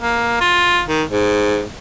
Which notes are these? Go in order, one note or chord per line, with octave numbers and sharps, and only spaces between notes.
A#3
F4
D#3
G#2